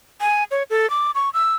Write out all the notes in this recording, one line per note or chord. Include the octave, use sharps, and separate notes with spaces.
G#5
C#5
A4
D6
C#6
E6